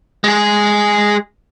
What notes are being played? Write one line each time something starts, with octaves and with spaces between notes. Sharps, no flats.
G#3 G#4